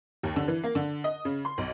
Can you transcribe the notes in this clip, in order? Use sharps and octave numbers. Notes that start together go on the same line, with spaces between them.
D#2
D3
E3
A#3
D3
D#5
C#3
C6
B1